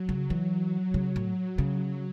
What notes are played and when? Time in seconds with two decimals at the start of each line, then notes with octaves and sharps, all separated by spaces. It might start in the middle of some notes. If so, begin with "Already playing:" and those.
Already playing: F#3
0.09 C#3
0.30 E3
0.94 C#3 F#3
1.16 A2
1.58 C#3 F#3